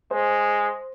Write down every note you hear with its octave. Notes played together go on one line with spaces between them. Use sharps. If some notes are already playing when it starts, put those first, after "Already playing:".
G#3 C5